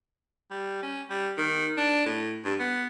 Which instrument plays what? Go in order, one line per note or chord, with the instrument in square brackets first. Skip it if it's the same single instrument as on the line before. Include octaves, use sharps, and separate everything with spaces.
[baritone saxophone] G3
C#4
G3
D#3
D4
A2
G2
B3